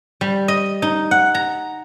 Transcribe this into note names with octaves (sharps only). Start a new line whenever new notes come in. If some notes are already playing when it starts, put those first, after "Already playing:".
G3
D#5
D#4
F#5
A#5